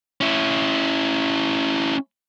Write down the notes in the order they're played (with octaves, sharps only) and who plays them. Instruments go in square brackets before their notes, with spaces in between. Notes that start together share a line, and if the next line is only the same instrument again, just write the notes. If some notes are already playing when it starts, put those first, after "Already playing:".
[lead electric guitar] C#4 E4